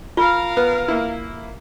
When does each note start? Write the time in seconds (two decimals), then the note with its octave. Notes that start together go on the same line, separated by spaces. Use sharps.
0.17 F4 A#4 F5
0.57 B3
0.88 A#3 E4